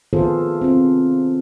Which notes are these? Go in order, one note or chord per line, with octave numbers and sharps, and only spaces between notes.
D#3 B3 F4 G#4 A4 C5
C4 F4